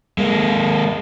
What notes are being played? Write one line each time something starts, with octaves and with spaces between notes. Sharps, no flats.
G#3 A#3